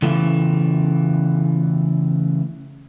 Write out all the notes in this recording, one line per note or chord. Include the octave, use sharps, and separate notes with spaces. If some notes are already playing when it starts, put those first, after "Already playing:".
C#3 E3 A3